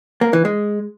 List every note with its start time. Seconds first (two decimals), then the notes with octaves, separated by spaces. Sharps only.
0.21 A#3
0.33 E3
0.45 G#3